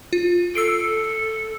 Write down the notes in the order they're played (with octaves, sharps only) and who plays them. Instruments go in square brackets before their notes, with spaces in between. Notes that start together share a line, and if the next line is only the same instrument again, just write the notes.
[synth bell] F4
[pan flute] A4 [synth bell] E6 C7 D7